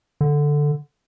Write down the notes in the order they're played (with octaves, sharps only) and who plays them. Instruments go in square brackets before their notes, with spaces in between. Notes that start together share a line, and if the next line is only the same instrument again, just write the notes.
[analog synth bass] D3